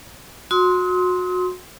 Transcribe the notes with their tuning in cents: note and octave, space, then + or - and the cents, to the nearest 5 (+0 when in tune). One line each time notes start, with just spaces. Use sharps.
F#4 -25 C6 +0 D#6 +40